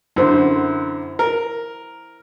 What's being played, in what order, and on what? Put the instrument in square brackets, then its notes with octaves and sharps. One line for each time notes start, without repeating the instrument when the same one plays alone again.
[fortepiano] F#2 D3 [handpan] E4 C5
[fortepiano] A#4